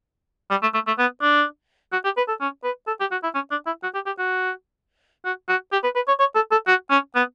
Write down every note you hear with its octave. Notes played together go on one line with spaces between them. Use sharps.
G3
A3
A3
A3
B3
D4
F#4
G4
B4
A4
C#4
B4
A4
G4
F#4
E4
C#4
D4
E4
F#4
G4
G4
F#4
F#4
F#4
G4
B4
B4
C#5
C#5
A4
A4
F#4
C#4
B3